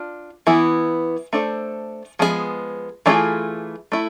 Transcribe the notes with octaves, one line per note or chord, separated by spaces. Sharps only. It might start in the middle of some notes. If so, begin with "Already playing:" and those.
Already playing: D4 F4
E3 B3 E4
A3 D4 A4 C5
F3 G#3 B3 D4 G#4
E3 A3 D4 F4 G#4
A3 E4